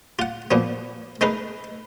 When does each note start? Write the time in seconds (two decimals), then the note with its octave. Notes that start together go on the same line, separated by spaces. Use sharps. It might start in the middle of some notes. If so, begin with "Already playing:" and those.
0.19 F4 F#5
0.51 A#2 F3 B3
1.21 G#3 A3 D#4 A#4 B4